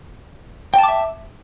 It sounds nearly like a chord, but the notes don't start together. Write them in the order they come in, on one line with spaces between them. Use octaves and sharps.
G5 A5 D6 E5